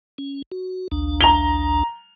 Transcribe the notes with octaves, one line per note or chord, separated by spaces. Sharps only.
C#4
F#4
A#1 D#2 D4
A#5 F7 G7